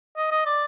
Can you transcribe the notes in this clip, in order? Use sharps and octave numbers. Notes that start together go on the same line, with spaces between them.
D#5
D#5
D5